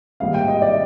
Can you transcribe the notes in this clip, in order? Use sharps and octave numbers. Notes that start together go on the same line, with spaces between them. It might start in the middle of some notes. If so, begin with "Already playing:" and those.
G#1 G#2 G3 A#3 F5
G5
D#5
D5